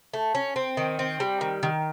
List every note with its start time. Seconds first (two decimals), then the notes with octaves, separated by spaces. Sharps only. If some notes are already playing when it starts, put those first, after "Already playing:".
0.14 A3
0.35 C#4
0.56 C4
0.77 D#3
0.99 C4
1.20 G3
1.41 D#3
1.63 D#3